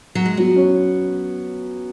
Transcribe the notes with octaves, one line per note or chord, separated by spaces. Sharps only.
F#3
G#3
F#3 B3
C#4